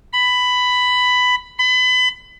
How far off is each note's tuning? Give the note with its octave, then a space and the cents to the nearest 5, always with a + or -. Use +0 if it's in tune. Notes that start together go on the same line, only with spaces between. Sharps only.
B5 +10
B5 +30